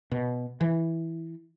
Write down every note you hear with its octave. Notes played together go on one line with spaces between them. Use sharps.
B2
E3